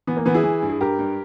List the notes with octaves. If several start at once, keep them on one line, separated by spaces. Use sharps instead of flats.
E3 B3
A#3
E3 B3
E4 G#4
E3
G2
G#4
G2 G4 A#4
G2